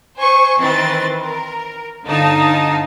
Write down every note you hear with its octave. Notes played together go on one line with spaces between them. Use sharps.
C5 G#5 C#6
D#3 E3 C4 B4 C6 A6
A#4
G1 D3 D#4 F5 A5